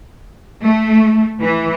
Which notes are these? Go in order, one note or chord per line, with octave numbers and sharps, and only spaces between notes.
A3
E3